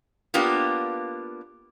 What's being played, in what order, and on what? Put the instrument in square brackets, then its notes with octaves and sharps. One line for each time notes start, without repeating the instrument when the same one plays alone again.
[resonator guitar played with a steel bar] A#3 B3 D4 F4 G4